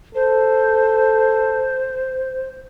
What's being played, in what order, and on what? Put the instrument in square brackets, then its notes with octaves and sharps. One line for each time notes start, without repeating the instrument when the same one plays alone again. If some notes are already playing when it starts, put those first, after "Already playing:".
[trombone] A4 [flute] C5